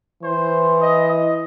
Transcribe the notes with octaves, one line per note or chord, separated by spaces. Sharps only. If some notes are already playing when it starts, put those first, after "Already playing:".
E3 C5
D#5
D#5